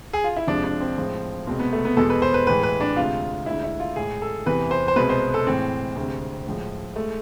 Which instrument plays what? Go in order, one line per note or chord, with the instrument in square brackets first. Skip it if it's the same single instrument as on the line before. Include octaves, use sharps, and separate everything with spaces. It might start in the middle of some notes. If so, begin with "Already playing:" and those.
[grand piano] G#4
F4
E4
F2 C3 F3 G#3 D4
D4
C4
A2 F3 G#3
C2 B2 G#3 C4
B3
A3
B3
E2 B2 G#3 A4
B4
C5
B4
A2 E3 G#3 B4
B4
D4
D2 C3 G#3 F4
D2 D3 G#3 E4
E4
F4
A2 G#3 G#4
A4
E2 C3 E3 B4
C5
C5
C2 B2 G#3 B4
C5
A4
A2 E3 G#3 C4
D2 C3 G#3
A2 F3 G#3
G#3 A3